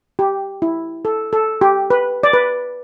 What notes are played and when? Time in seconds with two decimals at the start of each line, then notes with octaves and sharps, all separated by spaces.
0.19 G4
0.62 E4
1.05 A4
1.33 A4
1.61 G4
1.90 B4
2.23 D5
2.33 B4